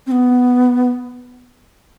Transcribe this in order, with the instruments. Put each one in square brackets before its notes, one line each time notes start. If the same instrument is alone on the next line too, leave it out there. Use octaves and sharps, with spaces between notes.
[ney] C4
B3